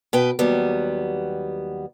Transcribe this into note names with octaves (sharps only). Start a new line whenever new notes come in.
B2 B4 G5
D#2 F#3 G3 B3